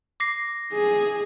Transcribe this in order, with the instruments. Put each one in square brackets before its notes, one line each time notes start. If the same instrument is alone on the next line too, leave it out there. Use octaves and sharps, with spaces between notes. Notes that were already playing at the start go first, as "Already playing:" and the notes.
[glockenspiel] D6 A#6 C7
[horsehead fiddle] G#4